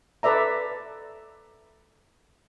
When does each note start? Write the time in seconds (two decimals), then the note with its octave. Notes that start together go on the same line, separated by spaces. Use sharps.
0.23 A4 B4 D5 E5 A#5